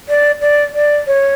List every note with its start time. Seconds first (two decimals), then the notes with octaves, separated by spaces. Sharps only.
0.09 D5
0.41 D5
0.74 D5
1.07 C#5